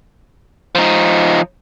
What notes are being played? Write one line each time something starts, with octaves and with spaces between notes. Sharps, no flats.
F3 D#4